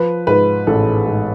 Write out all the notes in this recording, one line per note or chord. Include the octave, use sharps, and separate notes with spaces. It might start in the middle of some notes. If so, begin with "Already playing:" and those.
Already playing: F3 B4
G#2 B4
A1 A4
G#2